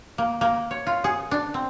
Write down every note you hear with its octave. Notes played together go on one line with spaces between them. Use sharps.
A#3
A#3
C#5
F4
G#4
D4
C4